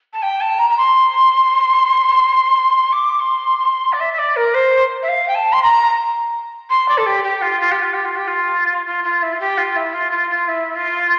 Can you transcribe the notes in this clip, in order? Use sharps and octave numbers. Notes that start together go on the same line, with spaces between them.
A5
G5
A5
A#5
A#5
C6
D6
C6
D5
E5
E5
D5
A#4
C5
E5
F5
G5
A5
C6
A#5
C6
D5
A4
G4
G4
F4
F4
G4
F4
G4
F4
G4
F4
F4
F4
E4
F4
G4
F4
E4
F4
F4
F4
E4
F4